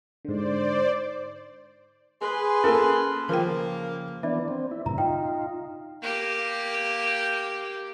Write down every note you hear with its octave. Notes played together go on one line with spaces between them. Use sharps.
G#2 D3 C5 D5
G#4 B4 C6
A#3 C#4 A4 A#4
C#3 F3 A#3 A#4 G5
E3 B3 D4 D5 E5
C4
E4
G2 A#2 C#3 A#5
D#4 F4 G5
A#3 G4